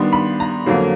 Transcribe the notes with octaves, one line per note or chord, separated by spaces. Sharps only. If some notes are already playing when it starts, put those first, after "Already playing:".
Already playing: D#3 G3 B3 D4 C6
B5
A#5
F2 D3 F#3 A#3